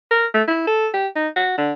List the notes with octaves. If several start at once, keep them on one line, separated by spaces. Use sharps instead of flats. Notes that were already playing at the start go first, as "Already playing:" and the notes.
A#4
A3
E4
A4
G4
D#4
F#4
D3